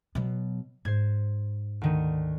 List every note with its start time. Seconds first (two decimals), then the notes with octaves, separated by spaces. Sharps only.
0.15 B2 F#3
0.85 G#2 C5 G#6
1.81 D2 D#3 D#7